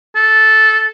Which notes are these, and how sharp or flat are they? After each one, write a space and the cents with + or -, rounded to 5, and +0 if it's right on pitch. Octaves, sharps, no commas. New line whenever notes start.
A4 -10